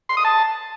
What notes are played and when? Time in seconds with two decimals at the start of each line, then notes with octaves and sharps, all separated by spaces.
0.09 C6
0.17 D#6
0.25 A5